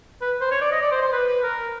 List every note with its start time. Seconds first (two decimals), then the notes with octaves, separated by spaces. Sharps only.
0.21 B4
0.41 C5
0.51 C#5
0.62 D5
0.72 D#5
0.82 D5
0.92 C5
1.02 C5
1.12 B4
1.27 B4
1.43 A#4